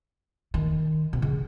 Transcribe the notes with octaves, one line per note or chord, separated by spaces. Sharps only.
D#3
C3
C#3